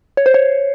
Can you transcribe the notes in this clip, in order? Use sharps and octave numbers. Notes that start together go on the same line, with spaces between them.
C#5
C5
C#5